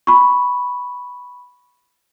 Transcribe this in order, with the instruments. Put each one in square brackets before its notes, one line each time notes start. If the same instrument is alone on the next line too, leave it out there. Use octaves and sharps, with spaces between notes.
[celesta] B5 C#6